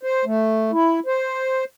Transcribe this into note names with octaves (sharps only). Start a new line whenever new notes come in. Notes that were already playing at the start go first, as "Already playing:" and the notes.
C5
A3
E4
C5